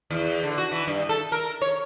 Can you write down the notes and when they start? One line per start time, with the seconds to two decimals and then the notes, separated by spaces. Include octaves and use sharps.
0.10 E2
0.43 D3
0.58 F#4
0.71 E3
0.87 G2
1.09 A4
1.32 A#4
1.61 C#5